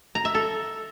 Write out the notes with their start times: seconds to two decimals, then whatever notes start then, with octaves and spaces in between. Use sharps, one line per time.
0.15 A#5
0.25 E5
0.35 A4